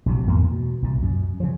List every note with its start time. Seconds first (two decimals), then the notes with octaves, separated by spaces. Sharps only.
0.06 A#1 C3 F#3
0.27 E2 G#2 A#3
0.52 B2
0.82 C2 A#2
1.02 F#2
1.40 C#3 F3